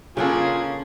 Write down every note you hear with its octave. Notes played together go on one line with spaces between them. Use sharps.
C#3 A#3 C#4 D4 F4 G#4 A4